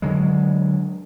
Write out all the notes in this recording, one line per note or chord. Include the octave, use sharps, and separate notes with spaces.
D3 F#3 G#3